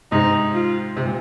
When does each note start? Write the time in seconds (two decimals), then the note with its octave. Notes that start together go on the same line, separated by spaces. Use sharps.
0.12 G#2 C3 D#4
0.54 F4
0.97 C3
1.05 A#2